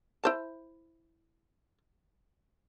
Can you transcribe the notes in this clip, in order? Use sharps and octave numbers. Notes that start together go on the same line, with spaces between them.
E4 C5 A5